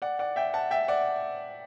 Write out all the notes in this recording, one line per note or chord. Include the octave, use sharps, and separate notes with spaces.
D5 F#5
D5 F#5
E5 G5
F#5 A5
E5 G5
D5 F#5